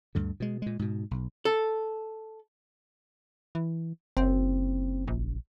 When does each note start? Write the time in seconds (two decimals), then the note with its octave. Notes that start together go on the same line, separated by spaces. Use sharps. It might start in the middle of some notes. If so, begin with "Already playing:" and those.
0.15 D2 G2 D3
0.40 B2 G#3
0.62 A#2 G#3
0.79 G#2 B2
1.11 B1
1.45 A4
3.55 E3
4.17 F#1 C4
5.07 A#1